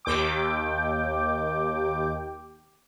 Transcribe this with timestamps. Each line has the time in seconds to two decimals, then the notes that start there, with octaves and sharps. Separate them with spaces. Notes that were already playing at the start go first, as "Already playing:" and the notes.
0.05 D#2 G5 D6